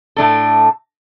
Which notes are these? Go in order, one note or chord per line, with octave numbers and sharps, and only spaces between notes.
A2 A3 D4 A4